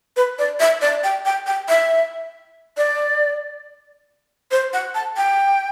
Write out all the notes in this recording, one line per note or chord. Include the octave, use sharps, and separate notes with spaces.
B4
D5
E5
D5
G5
G5
G5
E5
D5
C5
F#5
A5
G5